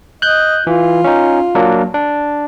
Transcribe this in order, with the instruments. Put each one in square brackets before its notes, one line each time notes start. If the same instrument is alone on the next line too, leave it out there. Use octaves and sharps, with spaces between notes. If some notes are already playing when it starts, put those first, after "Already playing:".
[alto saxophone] D#5 [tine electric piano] F#6 G6
[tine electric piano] E3 [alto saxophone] F4
[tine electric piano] C#4 D#4
F#3 A#3 D4
D4